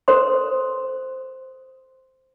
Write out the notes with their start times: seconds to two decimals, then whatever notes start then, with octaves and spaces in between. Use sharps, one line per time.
0.08 A4 B4 C5 C6